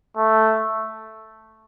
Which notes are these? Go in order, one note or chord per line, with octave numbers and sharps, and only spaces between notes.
A3